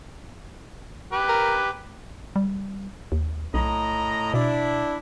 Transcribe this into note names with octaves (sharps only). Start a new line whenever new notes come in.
G4 B4
A#4
G3
D#2
B1 A2 D#5 A#5
B2 D4 E4